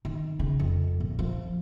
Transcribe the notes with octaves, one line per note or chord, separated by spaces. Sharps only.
D#3
C#3
F2
A#1
F3